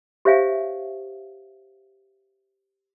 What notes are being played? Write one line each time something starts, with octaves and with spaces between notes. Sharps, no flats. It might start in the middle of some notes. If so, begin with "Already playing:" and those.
G4 C5 C#5 E5 F5 G#5